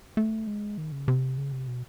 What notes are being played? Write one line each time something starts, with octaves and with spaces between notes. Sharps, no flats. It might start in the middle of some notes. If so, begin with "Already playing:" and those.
A3
G#3
D#3
C#3
C3
C#3
C3
B2